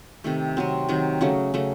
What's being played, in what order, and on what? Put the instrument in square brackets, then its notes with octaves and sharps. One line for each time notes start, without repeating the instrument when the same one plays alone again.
[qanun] C3 D#3 A3
C3 F#3 C4
C3 D#3 F#3
C#3 F#3 A3 C#4
C#3 F#3 A3